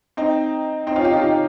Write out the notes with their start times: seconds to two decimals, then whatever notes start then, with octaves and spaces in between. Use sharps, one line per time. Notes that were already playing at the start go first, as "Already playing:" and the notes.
0.17 C4 D#4
0.87 C4 D#4
0.96 C#4 F4
1.04 D#4 G4
1.13 C#4 F4
1.22 D#4 G4